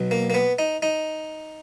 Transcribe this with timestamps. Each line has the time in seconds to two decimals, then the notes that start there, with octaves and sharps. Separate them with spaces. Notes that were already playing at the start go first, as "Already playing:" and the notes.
Already playing: B1 B2 F#3
0.11 A#3
0.30 A#3
0.34 B3
0.59 D#4
0.82 D#4